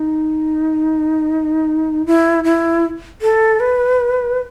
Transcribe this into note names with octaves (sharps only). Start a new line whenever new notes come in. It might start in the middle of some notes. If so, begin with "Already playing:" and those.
Already playing: D#4
E4
E4
A4
B4